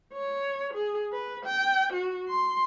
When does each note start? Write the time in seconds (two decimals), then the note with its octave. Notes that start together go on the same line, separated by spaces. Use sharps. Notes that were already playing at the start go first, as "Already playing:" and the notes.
0.13 C#5
0.74 G#4
1.13 B4
1.45 G5
1.93 F#4
2.29 C6